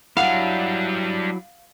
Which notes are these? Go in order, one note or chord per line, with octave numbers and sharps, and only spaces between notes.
F#3 G3 D4 E4 F5 F#5